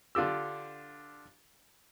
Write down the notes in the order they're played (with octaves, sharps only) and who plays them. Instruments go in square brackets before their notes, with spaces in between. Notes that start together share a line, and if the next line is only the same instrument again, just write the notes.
[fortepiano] D3 D4 F4 G4 E6